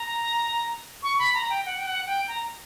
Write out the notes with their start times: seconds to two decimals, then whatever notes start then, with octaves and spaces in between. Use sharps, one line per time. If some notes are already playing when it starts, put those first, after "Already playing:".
Already playing: A#5
1.03 C#6
1.19 B5
1.34 A#5
1.50 G5
1.66 F#5
1.78 G5
1.87 F#5
2.07 G5
2.28 A#5